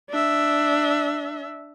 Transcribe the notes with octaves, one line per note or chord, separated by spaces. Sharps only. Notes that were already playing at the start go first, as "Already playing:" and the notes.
D4 E5